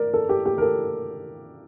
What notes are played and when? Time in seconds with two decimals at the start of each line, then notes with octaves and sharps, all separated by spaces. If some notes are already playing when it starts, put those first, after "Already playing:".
Already playing: A#4 D5
0.14 A4
0.29 G4
0.46 G4
0.58 A#4
0.62 A4